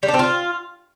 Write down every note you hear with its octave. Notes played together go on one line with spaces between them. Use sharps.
G3
D4
C4
F4